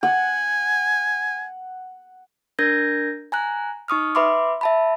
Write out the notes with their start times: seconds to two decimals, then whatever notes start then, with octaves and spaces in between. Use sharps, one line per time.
0.03 F#5 G#5
2.59 D4 A#4 G6 G#6 A#6
3.32 G#5 A#5 F#6
3.88 D#4 C#6 D#6 F6
4.15 B4 E5 B5 C6 D6
4.61 E5 A5 B5